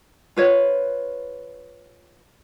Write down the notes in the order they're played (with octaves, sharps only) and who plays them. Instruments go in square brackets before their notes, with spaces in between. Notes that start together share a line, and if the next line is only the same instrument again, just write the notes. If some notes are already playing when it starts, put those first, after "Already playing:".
[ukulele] F4 B4 C#5